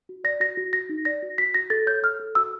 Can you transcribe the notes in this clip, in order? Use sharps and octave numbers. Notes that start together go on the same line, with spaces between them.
F#4
D5 A#6
F#4 A#6
F#4
F#4 A#6
D#4
D5 A#6
F#4
F#4 B6
F#4 A#6
A4 A6
C#5 G6
A4 F6
A4
F#4 E6